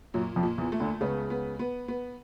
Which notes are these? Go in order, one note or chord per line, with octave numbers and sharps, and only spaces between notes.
F#2 A#2 F#3
F2 F3
A#2
E2 E3
A3
D2 D3
C#2 C#3 B3
B3
B3
B3